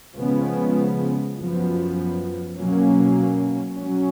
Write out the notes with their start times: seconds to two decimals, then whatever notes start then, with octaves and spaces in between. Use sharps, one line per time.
0.17 C#3 F3 G#3 B3
1.37 F#2 F3 B3
2.58 B2 F#3 A#3 C#4
3.79 F#3 C#4